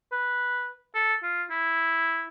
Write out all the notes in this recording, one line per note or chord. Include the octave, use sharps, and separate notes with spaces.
B4
A4
F4
E4